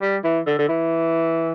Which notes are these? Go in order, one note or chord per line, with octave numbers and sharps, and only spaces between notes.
G3
E3
D3
D3
E3